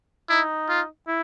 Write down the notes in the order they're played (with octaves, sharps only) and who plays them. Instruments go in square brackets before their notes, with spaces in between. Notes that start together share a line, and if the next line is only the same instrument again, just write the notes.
[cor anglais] D#4 [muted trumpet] E4
[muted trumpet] F4
[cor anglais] E4